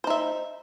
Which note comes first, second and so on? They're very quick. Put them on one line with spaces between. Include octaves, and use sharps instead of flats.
C5 D#4 E5